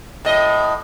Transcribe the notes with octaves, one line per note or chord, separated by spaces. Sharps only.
A2 D#5